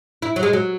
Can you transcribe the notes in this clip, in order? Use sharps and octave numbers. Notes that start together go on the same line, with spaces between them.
E4
F#3
G#3
F#3